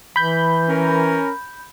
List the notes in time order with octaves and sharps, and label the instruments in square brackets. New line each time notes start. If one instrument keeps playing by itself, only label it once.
[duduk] E3 [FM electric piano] B5 G6
[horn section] C#4 A#4